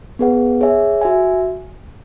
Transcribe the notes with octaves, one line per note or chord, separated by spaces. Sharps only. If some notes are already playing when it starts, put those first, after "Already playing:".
B3 G#4 B4 F#5
G#4 C#5 E5 G#5
F#4 E5 G#5